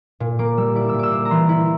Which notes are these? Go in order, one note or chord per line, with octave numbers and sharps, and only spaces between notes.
A#2
A#3 D6
G3 E6
E4 D6
E6
A#2
D6 E6
A#3
A#5
E3 C6
E4